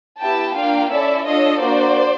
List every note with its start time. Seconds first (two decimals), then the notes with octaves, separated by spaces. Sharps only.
0.21 B3 E4 G4 G5 A5
0.56 A#3 D4 F4 F5 G5
0.91 C#4 E4 A4 D5 E5
1.26 D4 F4 A4 C#5 D#5
1.61 A#3 D4 F#4 C5 D5